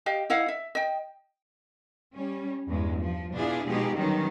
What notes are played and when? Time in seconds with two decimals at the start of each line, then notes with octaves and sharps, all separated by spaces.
0.06 G4 D#5 F5
0.30 E4 D#5 F5 F#5
0.48 E5
0.75 D#5 G5
2.13 G3 C#4
2.67 E2 G2 G#3
3.01 F3
3.34 B2 D4 E4 F4 G#4
3.66 B2 F3 G#3 D#4 G4 G#4
3.97 D#3 F#3 G3 B3 C#4 D#4